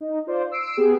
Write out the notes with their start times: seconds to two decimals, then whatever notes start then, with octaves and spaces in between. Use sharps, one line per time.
0.01 D#4
0.27 F4 C5 D5
0.52 E6 C7 D7
0.77 B3 G4 G#4